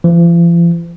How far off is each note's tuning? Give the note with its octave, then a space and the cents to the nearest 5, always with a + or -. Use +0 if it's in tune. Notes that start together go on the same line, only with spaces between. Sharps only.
F3 -45